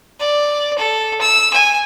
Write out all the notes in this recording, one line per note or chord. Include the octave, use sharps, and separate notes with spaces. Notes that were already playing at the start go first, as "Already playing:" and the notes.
D5
A4
E6
G#5